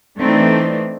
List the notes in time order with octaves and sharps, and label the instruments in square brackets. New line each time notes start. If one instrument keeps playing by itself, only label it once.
[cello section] E3 A3 C4 D4 D#4